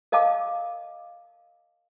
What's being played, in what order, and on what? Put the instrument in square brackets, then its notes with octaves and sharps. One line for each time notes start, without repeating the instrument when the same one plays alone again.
[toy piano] A#4 D#5 F5 A5 D6